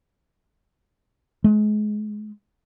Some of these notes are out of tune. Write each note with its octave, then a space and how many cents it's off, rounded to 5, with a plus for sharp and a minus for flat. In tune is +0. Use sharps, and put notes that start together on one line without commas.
G#3 +30